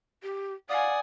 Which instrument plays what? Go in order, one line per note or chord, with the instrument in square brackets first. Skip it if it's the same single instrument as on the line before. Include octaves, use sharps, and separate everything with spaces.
[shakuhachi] G4
[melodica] D5 D#6 [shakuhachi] F5 [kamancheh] F#5 G#5